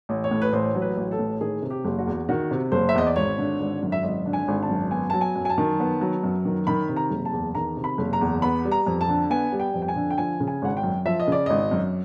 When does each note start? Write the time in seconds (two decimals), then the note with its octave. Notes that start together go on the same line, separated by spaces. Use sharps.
0.09 A1
0.24 C#5
0.31 A2
0.42 B4
0.52 A1 C5
0.75 F#3
0.82 B4
0.97 A1
1.11 A4
1.19 A2
1.41 D#3 G#4
1.62 C3
1.70 G4
1.85 F#1
1.99 F#4
2.07 E2
2.29 D#3 F#4
2.51 C3
2.72 F#1 C5
2.89 E5
2.95 E2 D#5
3.07 D5
3.16 G#1 C#5
3.38 D3
3.60 G#1
3.82 F#2
3.92 E5
4.03 G#1 D#5
4.25 D3
4.33 G#5
4.48 G#1
4.63 A5
4.69 F#2
4.91 B3 G#5
5.10 F#3 A5
5.21 G#5
5.36 F#2
5.45 G#5
5.50 A5
5.58 D#3
5.80 B3
6.01 F#3
6.24 F#2
6.45 D#3
6.67 D#3 B5
6.89 C3
6.96 A#5
7.11 F#1
7.25 A5
7.33 E2
7.55 D#3 A#5
7.77 C3
7.84 B5
7.98 F#1
8.13 A#5
8.21 E2
8.42 B3 B5
8.65 G3
8.72 A#5
8.87 F2
9.01 A5
9.08 D3
9.30 B3 G#5
9.52 G3
9.60 G5
9.74 F2
9.82 G5
9.88 G#5
9.95 D3
10.10 G5
10.18 F3 G#5
10.40 C#3
10.47 G#5
10.62 G#1 F#5
10.77 G5
10.83 F#2
11.05 F3 E5
11.20 D#5
11.27 C#3 D5
11.46 G#1 D#5
11.71 F#2